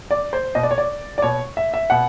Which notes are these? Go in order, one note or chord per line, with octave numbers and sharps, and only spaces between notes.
D5
C5
B2 D#5
D5
C#5
D5
D5
B2 C#5
E5
E5
B2 F#5